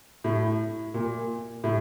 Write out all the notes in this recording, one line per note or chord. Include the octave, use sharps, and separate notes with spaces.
A2
A#2
A2